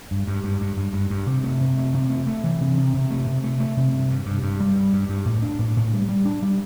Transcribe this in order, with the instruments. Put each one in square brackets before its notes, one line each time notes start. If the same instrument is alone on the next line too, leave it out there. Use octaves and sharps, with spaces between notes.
[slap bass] G2
G2
G2
G2
G2
G2
G2
C3
A3
C3
A3
C3
A3
A3
E3
C3
C3
C3
A3
C3
A3
A3
C3
G2
G2
G2
G2
G3
G2
G2
G2
A2
D4
A2
A2
G3
G3
D4
G3